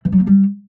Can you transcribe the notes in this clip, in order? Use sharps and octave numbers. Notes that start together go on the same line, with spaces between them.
E3
F#3
A#3
G3